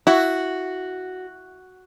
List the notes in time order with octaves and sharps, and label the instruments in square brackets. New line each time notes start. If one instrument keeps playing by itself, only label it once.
[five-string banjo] E4 [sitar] F#4